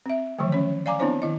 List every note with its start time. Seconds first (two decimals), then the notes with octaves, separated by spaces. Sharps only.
0.06 C4 E5
0.39 D3 D#3 F3 F#3 A3
0.52 C#4 C#5
0.86 D5 F5 G#5 A#5 D6
0.99 B3 C4 D4 E4 C5 C#5
1.22 D#3 E4 D#5